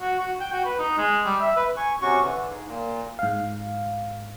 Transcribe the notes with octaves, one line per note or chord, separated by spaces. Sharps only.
F#4
F#4
G5
F#4
B4
D#4
G#3
G3
E5
B4
G#5 C#6
C3 C#4 F#4 C#6
D3 E3
G#2
A#2
G#2 F5